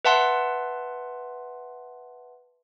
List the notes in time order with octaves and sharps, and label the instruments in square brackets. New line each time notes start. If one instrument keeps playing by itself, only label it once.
[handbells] B4 E5 F#5 A5 C6